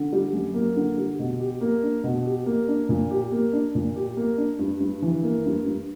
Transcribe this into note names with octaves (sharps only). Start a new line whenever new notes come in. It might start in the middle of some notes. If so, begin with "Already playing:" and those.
Already playing: D3
G3
F#2
A#3
D3
G3
B2
G4
A#3
D4
B2
G4
A#3
D4
A#2
G4
A#3
D4
A#2
G4
A#3
D4
G2
G2
E3
A#3
G2
G2